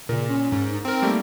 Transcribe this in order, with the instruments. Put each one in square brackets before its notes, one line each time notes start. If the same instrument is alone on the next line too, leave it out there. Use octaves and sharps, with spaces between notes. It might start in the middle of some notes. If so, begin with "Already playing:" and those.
[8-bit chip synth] A#2 [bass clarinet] C#3 [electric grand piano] A#4
[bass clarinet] C#4
[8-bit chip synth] G#2
[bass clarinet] D#4
[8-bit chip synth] C4 A#4
[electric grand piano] G3 A3 A#3